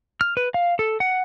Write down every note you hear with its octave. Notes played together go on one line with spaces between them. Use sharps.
F6
B4
F5
A4
F#5